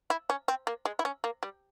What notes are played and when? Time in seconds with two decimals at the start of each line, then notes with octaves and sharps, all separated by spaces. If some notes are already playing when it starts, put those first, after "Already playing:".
0.10 E4
0.30 C#4
0.48 C4
0.67 A#3
0.85 G#3
0.99 E4
1.05 C#4
1.24 A#3
1.43 G3